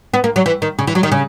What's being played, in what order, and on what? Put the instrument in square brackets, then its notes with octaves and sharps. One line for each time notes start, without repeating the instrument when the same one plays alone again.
[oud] B3
A#3
F#3
E3
D#3
C#3
E3
F#3
D#3
C#3